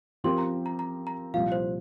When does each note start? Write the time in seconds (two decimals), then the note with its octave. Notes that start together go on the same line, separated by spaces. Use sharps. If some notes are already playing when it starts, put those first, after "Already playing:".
0.24 F3 C4 G4 A#4 C6
0.38 A#5
0.66 A#5
0.79 A#5
1.07 A#5
1.34 C2 A#2 F3 F5
1.52 C5